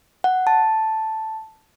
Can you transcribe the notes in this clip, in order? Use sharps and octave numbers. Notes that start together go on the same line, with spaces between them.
F#5
A5